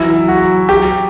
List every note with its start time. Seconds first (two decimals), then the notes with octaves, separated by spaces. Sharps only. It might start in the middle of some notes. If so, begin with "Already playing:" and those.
Already playing: E3 F#3 E4
0.13 F#3
0.28 F#4
0.42 F#3
0.69 F#3 G4